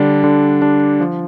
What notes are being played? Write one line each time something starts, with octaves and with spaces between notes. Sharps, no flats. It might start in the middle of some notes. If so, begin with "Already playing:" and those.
Already playing: D3 G3 D4
D3
G3 D4
F3